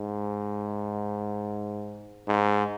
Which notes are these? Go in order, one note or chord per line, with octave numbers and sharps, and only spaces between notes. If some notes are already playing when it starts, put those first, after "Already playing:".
Already playing: G#2
G#2